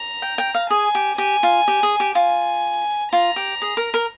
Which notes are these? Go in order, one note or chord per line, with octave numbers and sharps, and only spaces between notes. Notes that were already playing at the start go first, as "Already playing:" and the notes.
Already playing: A#5
G5
G5
F5
G#4 G#5
G4
G4 G#5
F4
G4
G#4
G4
F4 G#5
F4 A#5
G4
G#4
A#4
A#4